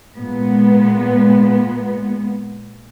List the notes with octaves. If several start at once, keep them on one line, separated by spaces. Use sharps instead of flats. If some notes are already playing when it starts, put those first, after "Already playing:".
A#2 G#3 B3